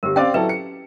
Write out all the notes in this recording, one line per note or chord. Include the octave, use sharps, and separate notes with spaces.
G1 G4 A#4
C4 C#4 D5 F5 G5
F#3 E4 A4 B4
C#7